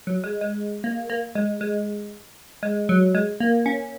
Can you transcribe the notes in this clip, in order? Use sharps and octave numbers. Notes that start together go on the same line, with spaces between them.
F#3
G#3
G#3
A#3
A#3
G#3
G#3
G#3
F#3
G#3
A#3
C#4